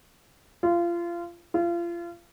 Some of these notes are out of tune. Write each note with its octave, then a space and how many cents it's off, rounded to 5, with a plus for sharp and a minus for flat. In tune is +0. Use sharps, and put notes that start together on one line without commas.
F4 -25
F4 -30